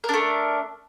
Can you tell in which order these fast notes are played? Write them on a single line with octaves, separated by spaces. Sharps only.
A#4 D4 A3